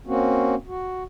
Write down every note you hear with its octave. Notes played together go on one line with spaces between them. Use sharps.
A#3 C4 C#4 F#4
F#4